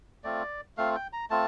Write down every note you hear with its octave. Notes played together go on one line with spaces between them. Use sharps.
A3 C4 F4 D5
A3 C4 F4 F5
G5
A#5
A3 C4 F4 A5